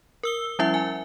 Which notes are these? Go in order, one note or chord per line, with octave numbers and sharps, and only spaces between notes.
A#4 E6 G7
F3 G3 C#4 E4 E5
G#5